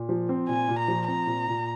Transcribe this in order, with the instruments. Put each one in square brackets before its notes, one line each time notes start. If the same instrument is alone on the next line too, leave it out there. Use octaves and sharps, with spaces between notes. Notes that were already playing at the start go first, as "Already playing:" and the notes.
Already playing: [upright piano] A#2
F3
C4
[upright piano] A#2 [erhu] G#5
[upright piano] A#2
[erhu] A#5
[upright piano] F3
[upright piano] C4 [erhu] A#5
[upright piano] A#2
A#2